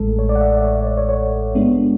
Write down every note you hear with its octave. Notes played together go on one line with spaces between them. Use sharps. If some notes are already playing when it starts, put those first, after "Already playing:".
Already playing: A1 A2 G#3 A4
C#5
D5
F#5
E5
D5
C#5
D5
D5
C#5
C#5
G#2 G#3 B3 D4